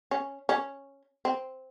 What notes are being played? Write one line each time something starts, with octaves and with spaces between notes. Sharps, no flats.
C#4
C#4
C4